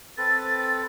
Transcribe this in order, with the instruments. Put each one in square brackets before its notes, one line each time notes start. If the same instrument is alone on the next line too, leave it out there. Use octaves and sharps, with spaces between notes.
[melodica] C4 A4 B4 [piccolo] A6